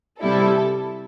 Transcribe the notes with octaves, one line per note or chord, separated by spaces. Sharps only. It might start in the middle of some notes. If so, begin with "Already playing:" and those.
C3 G3 E4 A4